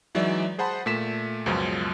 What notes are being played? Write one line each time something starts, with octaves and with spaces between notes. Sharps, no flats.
E3 F#3 G#3 D#4 D5 E5
G#4 C5 F#5 A5 B5 C6
A#2 A3 B6 E7
C#2 F#2 B2 F3 F#3 G#3